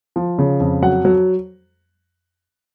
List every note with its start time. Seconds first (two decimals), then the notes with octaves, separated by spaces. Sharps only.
0.16 F3
0.39 C#3
0.60 F2
0.82 F#3 F#5
1.05 F#3